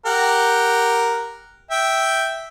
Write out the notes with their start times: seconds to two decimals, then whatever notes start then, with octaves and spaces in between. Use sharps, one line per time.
0.06 G4 A#4 F#5
1.71 E5 G5